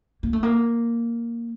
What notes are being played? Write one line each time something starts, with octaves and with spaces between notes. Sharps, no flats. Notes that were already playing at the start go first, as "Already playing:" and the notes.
A#3
A3
A#3